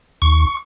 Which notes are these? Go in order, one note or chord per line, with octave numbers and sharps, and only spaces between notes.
D#2 C#6